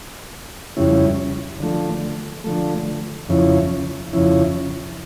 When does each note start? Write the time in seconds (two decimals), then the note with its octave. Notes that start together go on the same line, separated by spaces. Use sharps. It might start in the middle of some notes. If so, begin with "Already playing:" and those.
0.77 F2 C#3 G3 C#4 E4
1.60 D3 F3 A3
2.44 D3 F3 A3
3.29 F2 C#3 F3 C#4 E4
4.13 F2 C#3 F3 C#4 E4